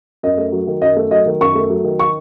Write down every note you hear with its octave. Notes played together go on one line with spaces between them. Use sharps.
F#2 D#5
A3
F#3
D#3
F#2 D#5
A3
F#3 D#5
D#3
F#2 C#6
A3
F#3
D#3
C#6